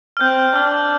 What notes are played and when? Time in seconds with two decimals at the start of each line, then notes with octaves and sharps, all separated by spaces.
0.17 F6
0.21 C4 G6
0.55 D4 F6